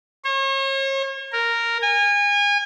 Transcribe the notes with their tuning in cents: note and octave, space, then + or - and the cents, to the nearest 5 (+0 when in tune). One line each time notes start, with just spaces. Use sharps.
C#5 -40
A#4 -5
G#5 -30